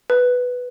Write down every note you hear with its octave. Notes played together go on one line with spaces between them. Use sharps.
B4